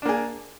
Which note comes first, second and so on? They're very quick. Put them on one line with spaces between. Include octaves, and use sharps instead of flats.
D4 A#3 G#4